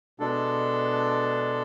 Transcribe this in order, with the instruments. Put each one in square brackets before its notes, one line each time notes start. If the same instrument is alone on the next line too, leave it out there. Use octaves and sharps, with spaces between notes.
[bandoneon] B2 G#3 D4 A4